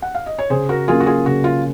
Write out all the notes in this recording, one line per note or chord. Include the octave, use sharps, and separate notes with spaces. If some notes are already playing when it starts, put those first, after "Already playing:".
F#5
F5
D#5
C#5
C#3 G#4 C5
F#4 A#4
F#3 A#3 C#4 F4 G#4
F#4
F4 G#4
C#3 F#4
F4